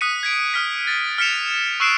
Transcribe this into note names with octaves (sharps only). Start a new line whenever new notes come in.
D#6 F#6 B6 C#7 D#7
G#6 B6 D7
D#6 F6 B6
A6
F6 B6 C#7 E7 F7
C#6 E6 F#6 C7 D7 E7